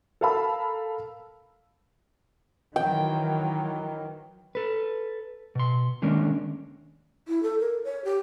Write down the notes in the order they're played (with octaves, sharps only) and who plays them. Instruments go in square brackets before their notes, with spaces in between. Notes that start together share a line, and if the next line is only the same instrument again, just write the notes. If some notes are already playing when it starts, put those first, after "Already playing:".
[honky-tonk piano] A4 A#4 F5 A5 B5 E6
[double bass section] D#3 E3 F#3 [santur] G5
[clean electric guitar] A4 B4
B2 C6
D3 D#3 G#3 A#3 C#4 D4
[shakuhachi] E4
A4
A#4
C#5
G4